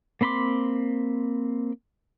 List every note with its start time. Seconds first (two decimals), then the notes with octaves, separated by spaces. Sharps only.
0.21 A#3 C4 B5 C6 D6